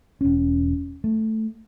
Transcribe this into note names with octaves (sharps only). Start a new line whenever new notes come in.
E1 C#4
A3